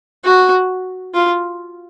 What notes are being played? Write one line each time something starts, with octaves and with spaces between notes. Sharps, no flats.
F#4
F4